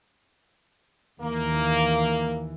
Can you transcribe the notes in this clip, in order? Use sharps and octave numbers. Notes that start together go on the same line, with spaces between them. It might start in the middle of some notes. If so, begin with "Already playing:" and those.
D#2 E3 A#3